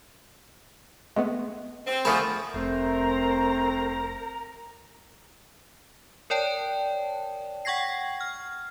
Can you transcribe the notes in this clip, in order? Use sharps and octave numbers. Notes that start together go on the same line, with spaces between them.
G#3 A3 B3
C4
D3 F3 A3 G#4 B5 C#6 D#6 E7
F1 A3 C4 A#4 C5 A#5
A#4 C#5 D5 G5 A5
F#5 G5 C#6 G#6 A#6 C7
F6